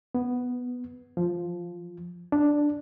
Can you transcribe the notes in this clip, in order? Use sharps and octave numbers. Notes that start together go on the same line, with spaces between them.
B3
F3
D4